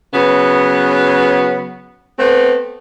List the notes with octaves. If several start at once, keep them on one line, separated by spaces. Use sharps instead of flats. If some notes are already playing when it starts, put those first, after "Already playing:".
C#3 F#3 B3
A3 B3 C4